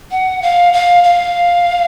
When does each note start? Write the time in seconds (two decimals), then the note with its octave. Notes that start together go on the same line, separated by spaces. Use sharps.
0.11 F#5
0.42 F5
0.73 F5
1.03 F5